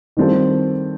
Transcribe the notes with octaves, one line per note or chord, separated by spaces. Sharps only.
D#3 G3 C4 F4 A4